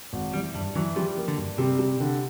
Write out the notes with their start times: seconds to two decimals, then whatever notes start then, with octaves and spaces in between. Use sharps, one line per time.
0.13 G#1
0.34 E3 G3
0.55 G2 G3
0.75 E3 F#3
0.96 F3 G3
1.17 A#3
1.28 D3
1.38 G2
1.58 C3 G3
1.79 G3
2.00 D3